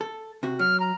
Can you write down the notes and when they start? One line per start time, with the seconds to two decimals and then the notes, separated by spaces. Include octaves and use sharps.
0.01 A4
0.43 C3 F#4
0.59 F#3 F6
0.80 A#5